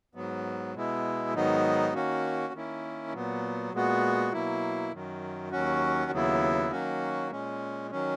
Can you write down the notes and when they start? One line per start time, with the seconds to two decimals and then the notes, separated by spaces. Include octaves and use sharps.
0.15 G#2 F#3 B3
0.74 B2 G#3 B3 E4
1.34 G#2 D#3 F#3 B3 D#4
1.94 D#3 A#3 C#4 F#4
2.53 D#3 A#3 C#4 E4
3.13 A#2 F#3 B3
3.73 A#2 G#3 B3 F#4
4.32 B2 F#3 A#3 E4
4.92 F#2 D#3 F#3
5.52 D#2 D#3 F#3 C#4 F#4
6.11 D#2 C#3 F#3 B3 E4
6.71 D#3 F#3 A#3 C#4 F#4
7.31 A#2 G#3 C#4
7.91 D#3 F#3 C#4